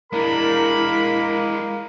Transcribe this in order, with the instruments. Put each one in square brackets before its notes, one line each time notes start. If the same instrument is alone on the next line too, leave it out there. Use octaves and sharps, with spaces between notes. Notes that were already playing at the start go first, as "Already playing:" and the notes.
[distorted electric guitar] G#3 D4 [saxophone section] A#3 [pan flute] E4 [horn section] A#4 B5